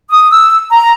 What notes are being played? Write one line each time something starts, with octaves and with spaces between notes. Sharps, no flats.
D#6
E6
A#5